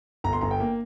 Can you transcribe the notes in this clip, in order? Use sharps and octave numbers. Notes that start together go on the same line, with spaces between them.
G1 A#5
C6
G1 A#5
G5
A#3